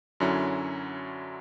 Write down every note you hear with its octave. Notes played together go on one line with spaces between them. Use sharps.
F#2 D3 F#3 C#4 E4